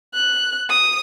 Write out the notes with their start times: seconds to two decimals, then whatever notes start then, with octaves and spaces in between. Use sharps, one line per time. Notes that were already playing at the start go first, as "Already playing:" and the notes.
0.14 F#6
0.70 D#6